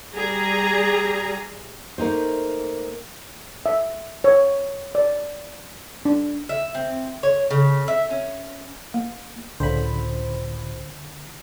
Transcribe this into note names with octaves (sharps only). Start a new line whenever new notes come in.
G3 G#4 A#5
A3 A#3 D#4 C5
E5
C#5
D5
D4
E5
C4
C#5
C#3
E5
C#4
A#3
C#2 A2 D3 C5 B5